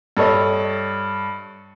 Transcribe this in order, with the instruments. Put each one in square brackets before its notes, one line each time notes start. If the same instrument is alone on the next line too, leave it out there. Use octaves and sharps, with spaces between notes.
[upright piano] G2 A4 C#5 D#5